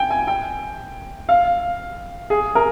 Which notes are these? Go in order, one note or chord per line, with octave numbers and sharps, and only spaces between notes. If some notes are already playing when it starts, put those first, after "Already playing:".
Already playing: G5 G#5
G#5
G5
F5
G#4
A#4